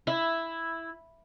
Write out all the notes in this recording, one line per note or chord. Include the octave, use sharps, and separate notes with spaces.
E4